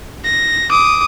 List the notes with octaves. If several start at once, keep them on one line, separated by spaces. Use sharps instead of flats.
A#6
D6 D#6